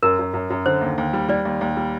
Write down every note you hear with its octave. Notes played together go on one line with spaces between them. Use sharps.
F#2 A#4
F#2
F#2
F#2
D3 C5
D#2
D#2
G3
G3 D5
D#2
D#2
G3